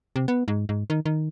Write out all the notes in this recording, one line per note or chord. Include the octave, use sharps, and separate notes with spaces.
C3
B3
G#2
G#2
D#3
D#3